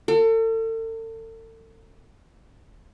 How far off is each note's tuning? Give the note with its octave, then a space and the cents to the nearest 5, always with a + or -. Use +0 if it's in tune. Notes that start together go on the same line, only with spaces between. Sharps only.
A4 +40